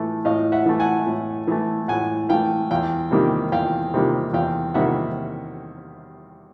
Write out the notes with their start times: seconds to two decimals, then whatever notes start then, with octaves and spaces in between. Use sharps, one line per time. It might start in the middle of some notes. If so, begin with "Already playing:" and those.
Already playing: A2 E3 A3
0.25 A2 D#5 F5
0.52 E5 F#5
0.66 E3 A3
0.80 F#5 G#5
1.07 A2
1.47 E3 A3
1.88 A2 F#5 G#5
2.29 E3 A3 F5 G5
2.71 E2 F5 G5
3.11 C3 D#3 G3 A#3
3.52 E2 F5 G5
3.94 C3 D#3 G3 A#3
4.33 E2 F5 G5
4.74 C3 D#3 G3 A#3 E5 F#5